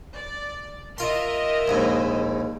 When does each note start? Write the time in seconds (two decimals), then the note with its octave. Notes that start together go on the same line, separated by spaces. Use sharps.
0.14 D5
0.98 F4 A#4 D#5 E5 C6
1.68 A#1 D#2 G#2